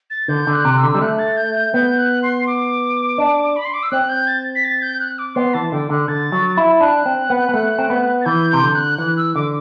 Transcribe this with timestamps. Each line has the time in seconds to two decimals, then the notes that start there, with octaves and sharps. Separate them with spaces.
0.10 A6
0.28 D3 G6
0.47 D3
0.53 F#6
0.65 C3
0.78 E6
0.83 D3
0.95 G3
1.01 A3 F#6
1.19 A6
1.37 G6
1.55 G6
1.74 B3 G6
1.98 F#6
2.23 C6
2.47 D6
3.18 D4
3.56 B5
3.65 C6
3.74 D6
3.83 E6
3.91 C4 F#6
4.09 G6
4.27 A6
4.55 B6
4.64 A6
4.82 G6
5.00 F#6
5.19 D6
5.36 B3 C6
5.54 E3 A5
5.72 D3 G5
5.90 D3 F#6
6.08 D3 A6
6.32 F#3
6.57 E4
6.81 D4 F#6
7.06 C4
7.30 B3
7.49 B3
7.54 A3
7.79 C4
7.90 B3
8.21 A6
8.26 E3 G6
8.50 C3 G6
8.62 D3
8.75 F#6
8.98 E3 F#6
9.17 E6
9.35 D3 D6